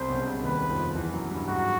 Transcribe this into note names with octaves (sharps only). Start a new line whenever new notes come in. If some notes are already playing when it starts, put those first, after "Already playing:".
Already playing: C2 C3 C5
B1 B2
C#3
C2 C3
D#2 D#3 B4
F2 F3
E2 E3
F#2 F#3
G2 G3
G#2 G#3 F#4